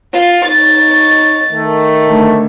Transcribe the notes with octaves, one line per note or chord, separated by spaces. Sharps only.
F4
D#4 C#5 A6
D#3 A3
D2